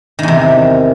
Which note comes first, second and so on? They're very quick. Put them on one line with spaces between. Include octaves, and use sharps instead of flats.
D#3 E2 C3